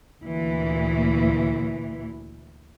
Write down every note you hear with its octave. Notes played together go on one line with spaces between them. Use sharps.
D2 A#2 E3